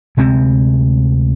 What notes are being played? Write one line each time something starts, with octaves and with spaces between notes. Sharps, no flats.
D2 C3 G#3 C4